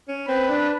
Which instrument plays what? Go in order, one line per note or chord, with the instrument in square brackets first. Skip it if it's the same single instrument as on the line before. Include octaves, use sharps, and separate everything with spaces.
[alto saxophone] C#4
[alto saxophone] C4 [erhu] B4
[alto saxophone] D4